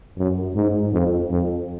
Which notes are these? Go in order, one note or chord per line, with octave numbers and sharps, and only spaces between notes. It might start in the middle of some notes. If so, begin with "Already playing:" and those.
F#2
G#2
F2
F2